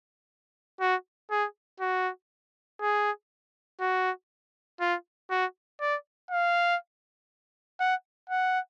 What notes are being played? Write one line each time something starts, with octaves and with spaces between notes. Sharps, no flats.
F#4
G#4
F#4
G#4
F#4
F4
F#4
D5
F5
F#5
F#5